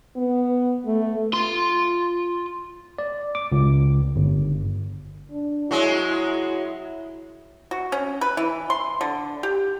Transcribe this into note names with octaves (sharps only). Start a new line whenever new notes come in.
B3
A3
F4 C6
D5
D6
C#2
G1
D4
F#3 G#3 E4
F#4
C#4
B4
E3
C6
D3
G4